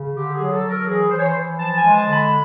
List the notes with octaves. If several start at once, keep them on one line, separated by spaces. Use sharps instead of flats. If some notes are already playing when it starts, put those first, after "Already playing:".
Already playing: C#3
D3 G4
G#4
F#3
A4
F#3
A#4
E3 G#4
E3 C5
C#5
C5
E3
F3 A5
G#5
G#3
A5
D3
B5